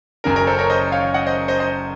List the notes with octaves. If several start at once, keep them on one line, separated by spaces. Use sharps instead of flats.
F#1 F#2 C#3 A#4
A#4
A4 C5
A#4 C#5
C5 D#5
C#5 F5
D#5 F#5
C5 D#5
C5 D#5
C5 D#5